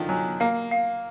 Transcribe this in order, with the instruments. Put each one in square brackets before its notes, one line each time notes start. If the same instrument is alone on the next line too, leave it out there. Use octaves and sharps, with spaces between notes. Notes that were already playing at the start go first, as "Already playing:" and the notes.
Already playing: [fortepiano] D3 D#3 F3
[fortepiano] F#3 [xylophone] G#5
[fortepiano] A#3 [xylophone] F5
[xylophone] F5